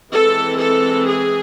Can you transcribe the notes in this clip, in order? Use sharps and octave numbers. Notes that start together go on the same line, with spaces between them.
E3 G#3 C4 A4
A4
G#4